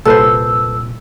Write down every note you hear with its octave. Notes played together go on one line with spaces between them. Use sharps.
C2 A#2 A4 B4 C5 E6